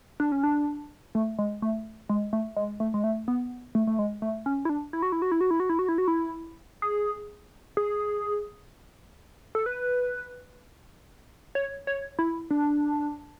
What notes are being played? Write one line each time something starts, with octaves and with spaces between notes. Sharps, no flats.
D4
C#4
D4
A3
G#3
A3
G#3
A3
G#3
A3
G#3
A3
B3
A3
A3
G#3
A3
C#4
E4
D4
E4
F#4
E4
F#4
E4
F#4
E4
F#4
E4
F#4
E4
F#4
E4
G#4
G#4
A4
B4
C#5
C#5
E4
D4